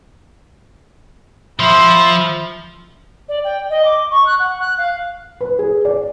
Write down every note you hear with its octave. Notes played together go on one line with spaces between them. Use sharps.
F3 E5 B5 C6
D5
G5
D#5
D6
C#6
F#6
F#5
F#6
F5
B4
G#4
D5